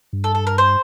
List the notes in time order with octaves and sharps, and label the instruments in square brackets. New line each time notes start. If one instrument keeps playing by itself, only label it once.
[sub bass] G2
[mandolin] A4
A4
A#4
C5